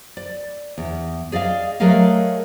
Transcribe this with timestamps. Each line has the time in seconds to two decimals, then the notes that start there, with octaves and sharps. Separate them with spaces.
0.17 D5
0.78 E2
1.32 G#4 D5 D#5 F5
1.80 F#3 A3 G#4 A#4 D#5 F5